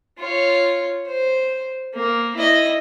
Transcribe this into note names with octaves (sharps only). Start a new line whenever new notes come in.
F4 C#5
C5
A#3
E4 D#5